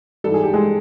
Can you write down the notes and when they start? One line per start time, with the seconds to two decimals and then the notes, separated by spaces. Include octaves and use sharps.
0.24 G#2 E3 G3 A4
0.34 G#4
0.43 G4
0.54 G#3 G#4